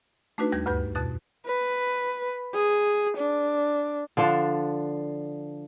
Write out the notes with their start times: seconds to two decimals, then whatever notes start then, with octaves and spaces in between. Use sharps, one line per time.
0.38 A3 D4 D#4 F#4 B4
0.52 D#2 G3 G#6 A#6
0.66 D2 G2 B4 G6
0.95 F2 B2 F#6 A6
1.45 B4
2.54 G#4
3.17 D4
4.17 D3 F3 D4